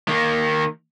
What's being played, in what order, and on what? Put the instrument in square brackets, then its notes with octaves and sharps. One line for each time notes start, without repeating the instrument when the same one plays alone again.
[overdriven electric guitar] D#3 A#3